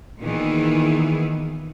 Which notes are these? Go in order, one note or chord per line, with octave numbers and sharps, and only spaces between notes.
A#2 D#3 E3 B3 G#4